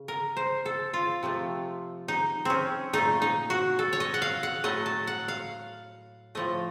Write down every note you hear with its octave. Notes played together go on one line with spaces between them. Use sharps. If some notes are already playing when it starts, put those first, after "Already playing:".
Already playing: C#3
A#4
C5
A4
F4
C3 F3 A3
D#4
C4 C#4
A#2 A3 D#4
D#4
F#4
A4
C#5
D#5
F#5
F5
F#5
A2 F#3 A3 D#5
A5
F#5
F5
A2 F3 A3 D#5